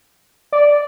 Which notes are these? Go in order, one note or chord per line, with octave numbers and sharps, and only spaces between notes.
D5